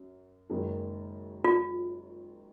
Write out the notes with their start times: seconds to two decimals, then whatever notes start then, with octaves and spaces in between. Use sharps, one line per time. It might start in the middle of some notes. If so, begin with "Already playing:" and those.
Already playing: F#2
0.50 F#1 F#2 D#3 G#3
1.44 F4